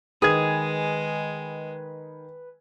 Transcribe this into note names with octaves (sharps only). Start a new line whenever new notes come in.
D#3 G#3 G#4 B4 G#6